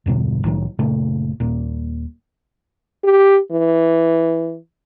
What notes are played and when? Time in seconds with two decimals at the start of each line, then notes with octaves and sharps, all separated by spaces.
0.06 E2 G2 B2 D3
0.43 C2 A2 D#3 F#3
0.79 F#1 A#2 C#3 A3
1.40 D#1 A#2
3.04 G4
3.52 E3